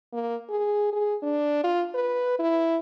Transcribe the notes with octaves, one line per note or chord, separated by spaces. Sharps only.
A#3
G#4
G#4
D4
F4
B4
E4